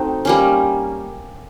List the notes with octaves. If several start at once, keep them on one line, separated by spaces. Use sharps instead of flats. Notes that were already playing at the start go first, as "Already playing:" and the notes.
Already playing: A3 C4 D#4 F#4
G3 A#3 C#4